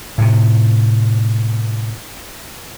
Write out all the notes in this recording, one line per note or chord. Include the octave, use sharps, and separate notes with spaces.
A2 C3